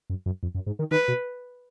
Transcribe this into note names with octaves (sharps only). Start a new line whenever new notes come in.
F#2
F#2
F2
F#2
G#2
D#3
D#3 B4
B2